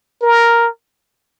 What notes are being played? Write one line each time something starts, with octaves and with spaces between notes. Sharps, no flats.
A#4